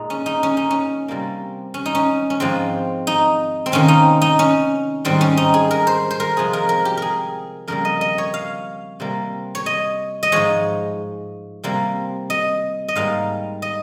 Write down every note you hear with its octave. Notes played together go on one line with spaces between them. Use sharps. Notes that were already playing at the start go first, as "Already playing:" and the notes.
Already playing: A#2 G#3 D#4
C#4
D#4
C#4
D#4
C#4
C3 G3 A#3
C#4
D#4
C#4
C#4
G#2 F3 G#3 C4
D#4
C4
C3 D#3 A#3 C#4
D#4
D#4
C#4
G#2 D#3 G3 C4
C#4
D#4
G#4
A#4
C5
C5
A#4
C3 F3 G#3 G#4
A#4
A#4
G4
G#4 A#4
F2 C#3 G3 A#3 A#4
D#5
D#5
C#5
F5
C3 G3 A#3
C#5
D#5
D#5
G#2 F3 G#3 C#5
C3 G3 A#3
D#5
D#5
G#2 G3 A#3 F5
D#5